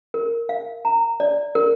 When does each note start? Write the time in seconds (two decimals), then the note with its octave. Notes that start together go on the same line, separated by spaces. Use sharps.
0.14 A#4
0.49 F5
0.85 A#5
1.20 D5
1.55 A#4